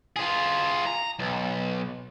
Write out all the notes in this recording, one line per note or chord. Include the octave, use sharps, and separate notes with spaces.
F4 G#4
A#5
B1